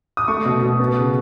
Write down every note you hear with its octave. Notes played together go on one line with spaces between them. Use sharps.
D#6
A3 C#6
B2
B2
B3
C#3